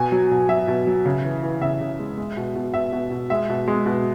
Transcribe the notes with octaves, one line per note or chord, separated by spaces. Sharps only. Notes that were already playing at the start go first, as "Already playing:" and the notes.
Already playing: B2 G#5
F#3
B2
F#3 E5
B2
F#3
C#3
E3
E3
C#3 E5
C#3
G#3
G#3
B2
B2
B2 E5
B2
B2
G#3 E5
B2
G#3
B2